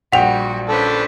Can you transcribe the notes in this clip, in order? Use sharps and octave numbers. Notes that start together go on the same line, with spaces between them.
A#1 G3 F#4 F#5 G5 F7
C#4 D4 A4 B4 C5